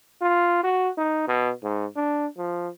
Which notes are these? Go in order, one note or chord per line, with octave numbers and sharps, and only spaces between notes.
F4
F#4
D#4
B2
G#2
D4
F3